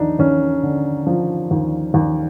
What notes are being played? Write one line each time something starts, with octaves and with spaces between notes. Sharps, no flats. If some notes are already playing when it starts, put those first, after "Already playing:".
Already playing: D#2 F3 D4 D#4
D#2 C#4
D3
F3
D#2
D#2